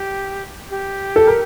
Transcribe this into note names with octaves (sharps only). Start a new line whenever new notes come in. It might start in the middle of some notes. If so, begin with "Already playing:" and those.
Already playing: G4
G4
A4
A#4